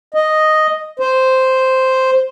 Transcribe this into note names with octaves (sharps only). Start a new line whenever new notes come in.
D#5
C5